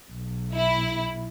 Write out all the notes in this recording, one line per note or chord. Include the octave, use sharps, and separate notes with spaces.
B1
E4